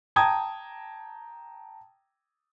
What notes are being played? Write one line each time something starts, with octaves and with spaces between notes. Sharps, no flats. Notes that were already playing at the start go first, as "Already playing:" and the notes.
G5 A5 A#5 D#6 G#6